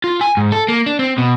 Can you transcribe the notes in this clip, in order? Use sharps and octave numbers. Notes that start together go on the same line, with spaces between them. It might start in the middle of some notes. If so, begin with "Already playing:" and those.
F4
G#5
G#2
A4
A#3
D4
C4
B2